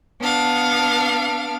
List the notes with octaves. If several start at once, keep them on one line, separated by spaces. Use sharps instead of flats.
B3 D4 F5